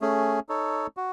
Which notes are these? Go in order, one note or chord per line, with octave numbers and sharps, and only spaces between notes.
A3 C#4 G#4
D#4 A4 C#5
F#4